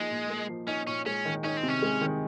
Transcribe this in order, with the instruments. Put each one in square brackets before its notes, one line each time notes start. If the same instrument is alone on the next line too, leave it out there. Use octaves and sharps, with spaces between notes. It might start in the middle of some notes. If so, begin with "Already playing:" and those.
Already playing: [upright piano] F3 A#3 D#4 [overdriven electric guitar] G#3
[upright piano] A#2
A#3
F3
[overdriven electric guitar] C#4 [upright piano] D#4
[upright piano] A#2 [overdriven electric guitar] C#4
[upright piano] G#3 [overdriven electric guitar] C#4
[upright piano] D#3
[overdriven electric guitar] C#4 [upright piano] D#4
[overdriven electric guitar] C4
[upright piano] C3 [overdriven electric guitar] C#4
[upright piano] G#3
D#3